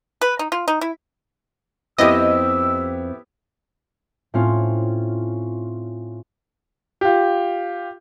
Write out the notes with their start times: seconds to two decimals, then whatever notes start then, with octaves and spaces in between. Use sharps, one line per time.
0.21 B4
0.39 D#4
0.52 F4
0.68 D#4
0.81 E4
1.98 F2 B3 C4 E4 G4 D#5 E6
4.34 A2 C4 C#4 F4
7.01 F4 G4